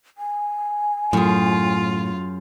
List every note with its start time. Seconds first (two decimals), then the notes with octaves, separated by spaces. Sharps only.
0.18 G#5
1.13 F#2 A2 F4 G#4